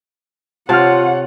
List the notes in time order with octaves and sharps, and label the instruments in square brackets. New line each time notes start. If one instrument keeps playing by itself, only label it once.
[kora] C3 C4 [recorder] F4 [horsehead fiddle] C#5 F#5 [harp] A5 F6